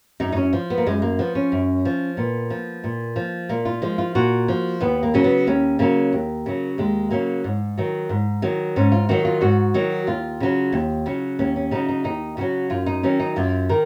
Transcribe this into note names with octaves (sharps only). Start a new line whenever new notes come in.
F#2 D#4
D#4
C#4
F3
B3
A#3
F#2 G#3
A#3
F3 B3
C#4
F#2
F3
A#2 B3
F3
A#2
F3
A#2 A#3
F4
F3 G#3
F4
A#2 F#4
F3
D#2 B3
A#3
C#3 F#3 C#4
B3
D#2 C#4
C#3 F#3 A#3
D#2
C#3 F#3
D#2 G#3
C#3 F#3 A#3
G#2
D#3 F#3
G#2
D#3 F#3
G#2 C#4
F4
D#3 F#3 F#4
F4
G#2 F#4
D#3 F#3
D#2 F4
C#3 F#3
D#2
C#3 F#3
D#2 C#4
C#4
C#3 F#3 D#4
D#4
D#2 D#4
C#3 F#3 F#4
F#2 F4
D#4
D#3 F#3 C#4
D#4
F#2 F4
D#3 A#4